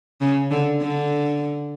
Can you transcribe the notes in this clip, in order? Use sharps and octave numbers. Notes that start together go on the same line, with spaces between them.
C#3
D3
D3